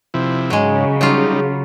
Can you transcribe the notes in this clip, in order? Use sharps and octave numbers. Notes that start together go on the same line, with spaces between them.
C3 F3 E4
G#2 C#3 F#3 G#3
F#3 G3 D#4 F4